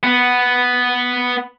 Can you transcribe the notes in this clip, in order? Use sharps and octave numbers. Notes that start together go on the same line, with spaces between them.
B3